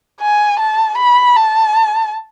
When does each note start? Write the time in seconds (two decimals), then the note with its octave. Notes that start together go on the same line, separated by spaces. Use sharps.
0.21 G#5
0.59 A5
0.98 B5
1.36 A5